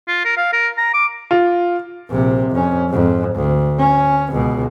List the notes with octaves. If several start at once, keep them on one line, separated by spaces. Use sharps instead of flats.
F4
A#4
F5
A#4
A#5
D6
F4
A#1 C3
F2 C#4
F2 G#2
D2
C#4
C#2 B2